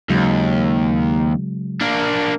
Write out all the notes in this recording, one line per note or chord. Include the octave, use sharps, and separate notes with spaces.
D#2 C#3 F#3 G#3
A#3 D4